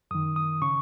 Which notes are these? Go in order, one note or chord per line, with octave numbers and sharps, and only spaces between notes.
F#2 D#3 D#6
D#6
C#3 C#6